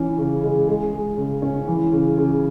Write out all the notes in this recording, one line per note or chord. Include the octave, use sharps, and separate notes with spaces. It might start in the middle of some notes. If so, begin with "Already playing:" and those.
Already playing: E3 C#4
C#3
G#3
G#3
G#4
C#3
C#4
E3
C#3
C#3